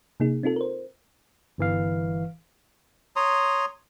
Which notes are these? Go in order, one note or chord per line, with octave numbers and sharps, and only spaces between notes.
C3 A#3 D#4 G#4
C4 D#4 F4 A4
A#4 C5
G1 E3 F5
C#5 A#5 C6 D#6